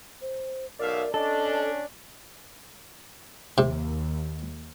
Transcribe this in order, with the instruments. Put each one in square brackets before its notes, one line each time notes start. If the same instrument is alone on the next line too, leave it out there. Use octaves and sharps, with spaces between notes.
[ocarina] C5
[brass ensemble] B1 E5 F5 [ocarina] A#4 [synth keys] D5
[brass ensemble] C#4 D4 [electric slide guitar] A4 [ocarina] D#5
[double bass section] D#2 [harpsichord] C3